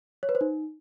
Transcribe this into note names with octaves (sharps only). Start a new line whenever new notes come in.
C#5
B4
C5
D#4